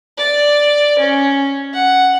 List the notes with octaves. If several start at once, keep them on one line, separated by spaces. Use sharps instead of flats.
D5
C#4
F#5